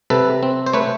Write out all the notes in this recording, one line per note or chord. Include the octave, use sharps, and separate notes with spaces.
C3 A4 B4
C4
C5
A3 B4 C#5